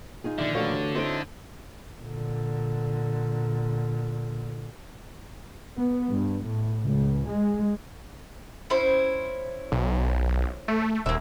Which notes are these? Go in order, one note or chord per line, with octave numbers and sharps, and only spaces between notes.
D#4 F4 G#4
A#2 D3 D#3 F3 D5 E5
A1 D4 F#4 A4 C#5 F5
C4 D#4 E4 A5 D7
A#2 D3
B3
G2
A2
C#2
G#3
C#4 E4 C5
B1
A3
D#1 A#3 E5